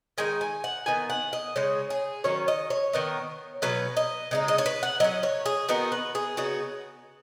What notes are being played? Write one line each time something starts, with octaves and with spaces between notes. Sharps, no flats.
D#3 G#3 D#4 G#5
G#5
F#5
D#3 B3 D#4 G#5
F#5
D#5
C#3 G#3 D#4 C#5
G#4
D#3 F#3 C#4 C#5
D#5
C#5
D#3 B3 D#4
B2 F#3 C#4 B4
D#5
C#3 G#3 D#4
D#5
C#5
B4
F#5
F#3 C#4 D#5
C#5
G#4
D#3 B3 D#4 F#4
B4
G#4
C#3 B3 D#4 F#4